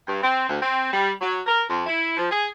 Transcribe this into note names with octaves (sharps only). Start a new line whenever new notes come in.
G2
C4
D2
C4
G3
F#3
A#4
F2
E4
F3
G#4